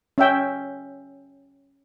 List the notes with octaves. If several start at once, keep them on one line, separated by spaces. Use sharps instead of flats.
C#4 E5 G5